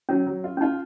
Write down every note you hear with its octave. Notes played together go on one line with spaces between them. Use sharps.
F#3 C#4
F#3
F4
C#4
D#4 F4